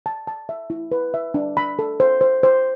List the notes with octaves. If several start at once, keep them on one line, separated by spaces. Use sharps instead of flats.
A5
A5
E5
E4
B4
E5
D4
B5
A4
C5
C5
C5